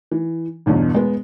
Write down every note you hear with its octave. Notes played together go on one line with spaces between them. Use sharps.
E3
G1 E2 G2 B2
G#3 B3